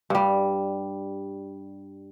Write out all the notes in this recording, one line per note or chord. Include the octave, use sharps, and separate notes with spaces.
G2 G3